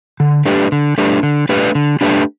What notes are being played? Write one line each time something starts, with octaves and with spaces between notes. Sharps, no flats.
D3
A3 D4 G4 B4
D3
A3 D4 G4 B4
D3
A3 D4 G4 B4
D3
A3 D4 G4 B4